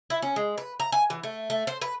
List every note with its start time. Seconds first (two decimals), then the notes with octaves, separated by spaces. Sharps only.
0.10 E4
0.22 C#4
0.36 G#3
0.58 B4
0.80 A#5
0.92 G#5
1.10 E3
1.24 A3
1.50 A3
1.67 C5
1.82 B4